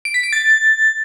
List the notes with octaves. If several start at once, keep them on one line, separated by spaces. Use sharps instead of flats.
D7
B6
D7
A6